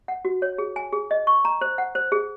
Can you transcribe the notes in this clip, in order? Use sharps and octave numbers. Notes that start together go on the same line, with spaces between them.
F#5
F#4
C#5
G#4
G#5
G#4
D#5
C#6
A#5
C5
F#5
C5
G#4